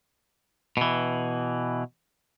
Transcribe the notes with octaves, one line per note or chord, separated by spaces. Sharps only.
B2 E3